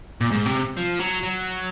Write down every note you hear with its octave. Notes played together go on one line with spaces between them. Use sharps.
A#2
G#2
C3
F3
F#3
F#3